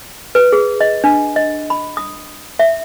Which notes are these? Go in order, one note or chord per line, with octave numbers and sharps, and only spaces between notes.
B4
G#4
D#5
D4
D#5
B5
D#6
E5